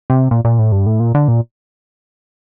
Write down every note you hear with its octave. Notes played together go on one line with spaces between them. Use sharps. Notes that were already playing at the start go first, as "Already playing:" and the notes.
C3
A#2
A#2
A2
G2
A2
A#2
D3
A#2